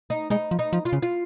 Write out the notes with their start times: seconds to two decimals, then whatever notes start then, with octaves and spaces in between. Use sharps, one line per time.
0.10 D#4
0.30 G#3 D#4
0.51 F3
0.59 D#4
0.73 F3
0.85 F4
0.93 C#3
1.02 F4